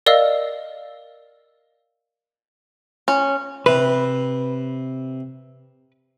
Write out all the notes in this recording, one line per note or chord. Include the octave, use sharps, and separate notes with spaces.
A#4 D5 D#5 F5 E6
C#4
C3 B4